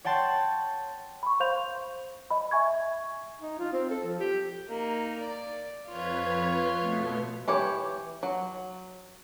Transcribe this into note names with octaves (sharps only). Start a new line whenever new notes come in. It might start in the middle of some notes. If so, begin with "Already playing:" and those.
C#5 F#5 G5 A5 C6
B5 C#6
C5 F5 C6 G6 F7
D#5 B5
E5 G#5 C#6 G#6
D#4
F4
C4
A4
F3
G4
A#3 D#4
D5
F2 F4 B4 C#5 G#6
B2 A3 B3
E3 G4 C#5
F#3